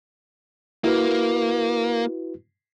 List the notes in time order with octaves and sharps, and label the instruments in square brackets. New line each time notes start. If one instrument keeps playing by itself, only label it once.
[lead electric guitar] A#3 [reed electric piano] E4 F#4 B4